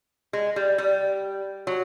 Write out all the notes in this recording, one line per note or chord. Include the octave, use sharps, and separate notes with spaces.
G#3
G3
G3
F#3